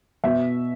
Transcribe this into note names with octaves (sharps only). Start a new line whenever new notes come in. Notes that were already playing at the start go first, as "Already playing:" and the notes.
B2 E5